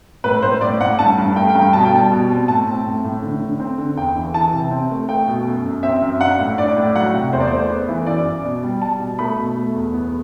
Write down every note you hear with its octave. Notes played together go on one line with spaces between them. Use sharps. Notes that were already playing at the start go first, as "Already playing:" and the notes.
A2 B4
A2 C5
A2 D5
A2 F#5
G2 A5
G2
A3 G5
G5
G2
G5
B2 A5
G5
G3 A5
B2
C4
A2 A5
C4
A2
A2
D3
D3
C4
D3
E2 G5
E3
E3 A5
C3
C4
A3
A3 G5
B2
F#2
F#2
C4 E5
F#2
D4 F#5
A2
D4 D5
A2
F#3 F#5
C3
E2 C5
D5
A3 C5
B3
E3
F#2 D5
F#2
B2
G3
G3 A5
B2
A3 B5
B2
A3
E2
B3